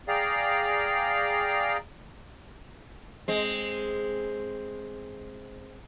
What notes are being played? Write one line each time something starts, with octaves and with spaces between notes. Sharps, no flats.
G#4 D5 F5 G5 A#5
G#3 C4